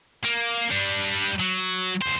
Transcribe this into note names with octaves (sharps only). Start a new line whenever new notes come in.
A#3
G3 D4
F#3
E2 C5